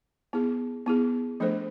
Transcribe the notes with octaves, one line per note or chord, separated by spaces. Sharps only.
B3 E4 G#4
B3 E4 G#4
F3 A3 D4 A4 C5